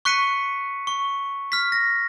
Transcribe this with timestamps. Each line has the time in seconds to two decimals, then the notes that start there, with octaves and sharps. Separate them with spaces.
0.05 C#6 F#6 B6 C#7 D#7
0.87 C#6
1.52 F6 B6
1.72 A#6